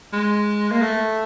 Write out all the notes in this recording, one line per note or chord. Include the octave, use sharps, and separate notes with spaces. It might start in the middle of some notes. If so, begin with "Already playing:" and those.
G#3
A#3
A3